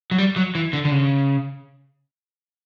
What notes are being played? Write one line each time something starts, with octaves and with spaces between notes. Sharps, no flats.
F#3
G3
F#3
E3
D3
D3
C#3